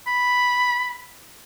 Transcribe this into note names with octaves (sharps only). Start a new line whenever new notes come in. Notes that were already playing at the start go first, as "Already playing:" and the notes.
B5